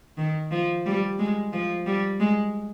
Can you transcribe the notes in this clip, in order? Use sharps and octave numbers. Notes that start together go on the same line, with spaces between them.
D#3
F3
G3
G#3
F3
G3
G#3